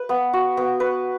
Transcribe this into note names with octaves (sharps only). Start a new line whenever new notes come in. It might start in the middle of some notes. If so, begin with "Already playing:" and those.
Already playing: B4
B3
F#4
B3
B4